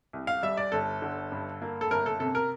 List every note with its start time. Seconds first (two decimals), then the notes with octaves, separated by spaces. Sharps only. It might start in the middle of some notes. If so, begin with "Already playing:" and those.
0.13 C2
0.27 F5
0.43 G3 E5
0.57 D5
0.72 G1 A4
1.02 D3
1.32 G2
1.62 A#3
1.81 A4
1.91 G1 A#4
2.06 A4
2.20 C3 A4
2.35 A#4